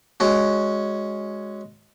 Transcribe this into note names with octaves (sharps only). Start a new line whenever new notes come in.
G#3 C#4 F#4